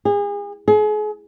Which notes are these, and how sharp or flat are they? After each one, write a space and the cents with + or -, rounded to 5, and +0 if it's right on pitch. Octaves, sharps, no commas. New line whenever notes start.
G#4 -35
G#4 +35